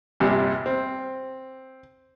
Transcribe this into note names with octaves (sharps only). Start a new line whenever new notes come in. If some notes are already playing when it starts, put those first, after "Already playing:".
A#1 E2 G2 C3
C4